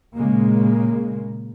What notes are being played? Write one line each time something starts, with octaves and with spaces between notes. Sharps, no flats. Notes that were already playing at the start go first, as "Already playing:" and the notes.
A#2 C#3 G#3 A#3